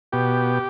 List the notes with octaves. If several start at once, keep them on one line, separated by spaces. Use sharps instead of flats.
B2 G4